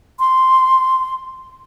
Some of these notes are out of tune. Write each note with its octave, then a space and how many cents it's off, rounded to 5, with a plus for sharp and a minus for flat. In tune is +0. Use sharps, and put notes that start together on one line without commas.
C6 -5